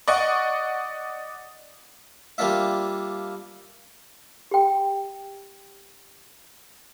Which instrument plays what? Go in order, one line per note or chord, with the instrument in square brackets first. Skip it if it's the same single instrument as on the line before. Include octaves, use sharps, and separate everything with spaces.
[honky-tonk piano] D5 D#5 F#5 C#6
[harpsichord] G3 A#3 D4 F4 E5
[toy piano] G4 G5